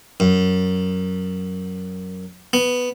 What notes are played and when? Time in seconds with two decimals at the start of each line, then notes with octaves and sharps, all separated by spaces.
0.20 F#2
2.53 B3